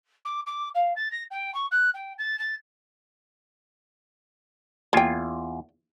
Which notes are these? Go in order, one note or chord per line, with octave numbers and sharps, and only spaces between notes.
D6
D6
F5
A6
A#6
G5
C#6
F#6
G5
A6
A6
E2 A#3 F4 G5 G#5